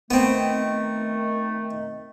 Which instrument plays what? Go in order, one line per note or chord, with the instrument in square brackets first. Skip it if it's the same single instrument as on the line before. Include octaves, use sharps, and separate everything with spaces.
[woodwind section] D#3 A3 [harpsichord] B3 C4